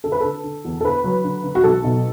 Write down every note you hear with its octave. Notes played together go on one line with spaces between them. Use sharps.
D3 A4
B4
D3 A4
D3
E2
A4
D3 B4
F#3
D3
D3
F#4
B1 A4
B2